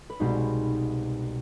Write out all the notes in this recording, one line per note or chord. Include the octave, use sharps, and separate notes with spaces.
B4
C2 B2 G#3 B3 D#4 C5